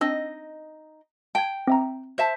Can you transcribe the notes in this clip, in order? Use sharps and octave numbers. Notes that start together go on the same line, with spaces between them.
C4 D4 D#4 D#5 E6
G5 A5 G#6
C4 E5 A#5
C5 E5 A5